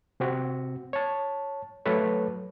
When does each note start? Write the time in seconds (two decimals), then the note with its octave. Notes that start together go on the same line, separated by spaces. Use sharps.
0.20 C3 C4 F#4
0.93 C#5 A5
1.85 F#3 A3 A4 B4 C#5